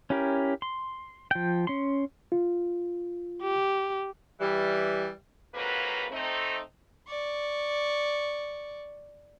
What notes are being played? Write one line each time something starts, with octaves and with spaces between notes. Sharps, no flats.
C#4 E4 G4 A#4
C6
F3 G5
C#4 C6
F4
G4
E3 G3
F2 G#2 F#3 A#3 B4
A3 C4 D#4
D5 C#6